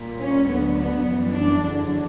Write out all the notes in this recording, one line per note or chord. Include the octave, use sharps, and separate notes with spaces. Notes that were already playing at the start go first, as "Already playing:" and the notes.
Already playing: A#2 G3
C#4
D2 D3 F#3 B3
B3
F#2 E3 G3
D4
E2 D3 F#3 D4